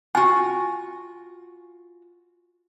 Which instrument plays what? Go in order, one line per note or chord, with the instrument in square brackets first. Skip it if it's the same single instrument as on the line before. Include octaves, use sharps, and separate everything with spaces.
[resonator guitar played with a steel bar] F4 F#4 [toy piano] G#5